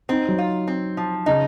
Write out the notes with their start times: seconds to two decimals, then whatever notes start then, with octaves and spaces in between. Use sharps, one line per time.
0.09 C4 D#4
0.28 F#3
0.38 F4
0.68 C4
0.97 F3
1.26 C#3 D#4